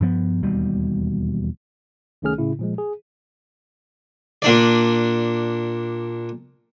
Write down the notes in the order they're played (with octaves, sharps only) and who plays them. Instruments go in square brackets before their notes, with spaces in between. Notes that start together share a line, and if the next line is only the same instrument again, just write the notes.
[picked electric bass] G2 F3 B3
E1 D#2 B2 G3
[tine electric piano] C2 D#3 A3 C#4 G#4 F6
A2 C#3 E4
A#2 F3 G#3
G#4
[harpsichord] A#2 D4 D5